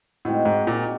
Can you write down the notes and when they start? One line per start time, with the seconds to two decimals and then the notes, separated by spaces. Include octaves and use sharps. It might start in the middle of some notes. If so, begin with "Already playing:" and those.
0.25 A2 G#3 C4 D#4 F#4
0.45 G#2
0.67 A#2